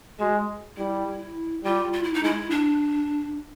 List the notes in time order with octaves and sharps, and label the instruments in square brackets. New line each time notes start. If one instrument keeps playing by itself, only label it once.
[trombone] G#3 [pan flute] F#4
[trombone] G3 [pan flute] E4
[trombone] G3 [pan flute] F4
[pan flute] F4
E4
D#4
[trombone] G#3 [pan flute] E4
[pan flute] D4